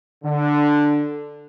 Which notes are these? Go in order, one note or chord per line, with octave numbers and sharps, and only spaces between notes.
D3